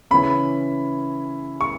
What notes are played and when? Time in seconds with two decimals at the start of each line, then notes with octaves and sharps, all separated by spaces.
0.11 C#3 E3 C#4 B5
1.61 C#6